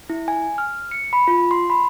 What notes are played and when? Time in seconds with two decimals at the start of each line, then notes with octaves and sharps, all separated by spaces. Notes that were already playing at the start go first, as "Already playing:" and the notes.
0.10 E4
0.28 G#5
0.58 F6
0.91 C#7
1.13 B5
1.28 F4
1.51 C6
1.70 B5